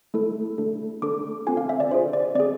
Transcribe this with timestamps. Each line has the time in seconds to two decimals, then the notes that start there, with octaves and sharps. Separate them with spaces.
0.14 A3 E4 A4
0.58 A3 D4 A4
1.02 A3 D4 A4 D6
1.47 C4 F4 A4 G#5
1.57 F5
1.69 E5
1.80 D5
1.91 D4 F4 G#4 C5
2.13 D5
2.35 C4 G#4 D5